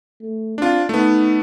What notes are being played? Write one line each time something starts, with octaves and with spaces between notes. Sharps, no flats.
A3
C4 D4 F4
A3 B3 D#4